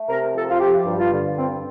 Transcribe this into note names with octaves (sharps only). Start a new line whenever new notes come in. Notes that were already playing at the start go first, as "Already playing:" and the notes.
Already playing: A3
C3 A#4
F3 A4
F4
F3 G4
G2
F4
D3
G2 C4